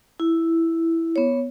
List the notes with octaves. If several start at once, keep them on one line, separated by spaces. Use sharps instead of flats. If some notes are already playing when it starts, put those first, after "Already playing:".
E4
B3 C#5